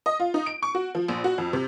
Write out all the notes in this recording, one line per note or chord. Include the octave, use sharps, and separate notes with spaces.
D#5
F4
D#4
D7
C#6
F#4
F3
A#1
F#4
F2
C3